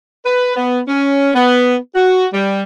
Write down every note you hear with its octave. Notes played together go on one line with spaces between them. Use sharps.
B4
B3
C#4
B3
F#4
G3